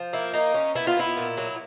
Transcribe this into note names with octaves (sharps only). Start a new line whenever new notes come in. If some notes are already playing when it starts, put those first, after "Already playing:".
Already playing: F3
A#3 E4
A#3 D#4
C#4
B3 E4
F4
B3 E4
A#2
F#3